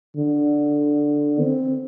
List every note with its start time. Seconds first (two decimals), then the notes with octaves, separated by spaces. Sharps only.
0.16 D3
1.41 C4